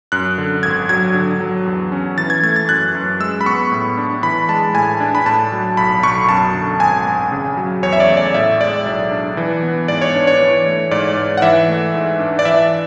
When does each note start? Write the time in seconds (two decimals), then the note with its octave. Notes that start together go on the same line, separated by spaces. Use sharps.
0.12 F#2 F#6
0.38 D3
0.63 G#1 G#6
0.89 F#3 G#6
1.15 D3
1.40 F#3
1.66 E2
1.92 C#4
2.18 E3 A6
2.30 G#6
2.43 A3 G#6
2.56 A6
2.69 F#2 F#6
2.95 F#2
3.20 G#3 E6
3.41 B5
3.46 B3 C#6
3.72 A2
3.98 D4
4.23 E3 B5
4.49 G#3 A5
4.74 A2 G#5
5.00 D4
5.15 B5
5.26 A2 A5
5.52 F#3
5.77 B1 B5
6.03 B1 C#6
6.29 F#2 A5
6.54 D3
6.80 G#1 G#5
7.06 G#1
7.32 C#3
7.57 F#3
7.83 E2 C#5
7.93 E5
8.00 D5
8.09 A3
8.17 D5
8.34 A2 E5
8.60 G#3 D5
8.85 B1
9.12 D4
9.37 E3
9.63 B3
9.88 G#2 D5
10.02 C#5
10.14 D4
10.27 C#5
10.40 E3
10.66 A3
10.91 G#2 D5
11.17 G#2
11.37 F#5
11.42 E3 E5
11.68 A3
11.94 G#2
12.20 D4
12.39 D5
12.45 E3 E5